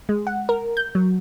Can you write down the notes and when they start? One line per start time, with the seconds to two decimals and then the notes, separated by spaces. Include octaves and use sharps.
0.09 G#3
0.27 F#5
0.49 A#4
0.77 G6
0.95 F#3